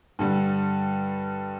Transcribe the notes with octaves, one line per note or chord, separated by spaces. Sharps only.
G2 D3 G3